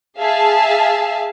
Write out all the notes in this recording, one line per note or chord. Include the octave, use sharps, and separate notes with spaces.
G#4 E5 F5 A5